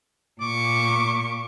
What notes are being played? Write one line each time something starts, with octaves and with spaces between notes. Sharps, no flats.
A#2 C#6 D6